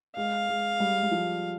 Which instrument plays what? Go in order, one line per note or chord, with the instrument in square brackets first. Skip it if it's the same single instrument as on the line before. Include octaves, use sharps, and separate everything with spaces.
[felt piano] G#3 [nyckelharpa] F5
[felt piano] G#3
G3
G3
F3